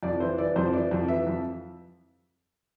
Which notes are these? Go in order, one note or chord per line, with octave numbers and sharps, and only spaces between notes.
F2 D5
E3 C5
E3 D5
F2 C5
E3 D5
F2
E3 E5
F2